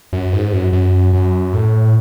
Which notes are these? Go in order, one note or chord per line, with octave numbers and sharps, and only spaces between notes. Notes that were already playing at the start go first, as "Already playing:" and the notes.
F#2
G#2
F#2
F#2
F#2
A2